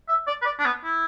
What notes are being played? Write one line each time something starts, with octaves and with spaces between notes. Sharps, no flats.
E5
D5
B4
D5
D4
B3
E4